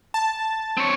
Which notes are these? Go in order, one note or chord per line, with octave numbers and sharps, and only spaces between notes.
A5
C4 C#5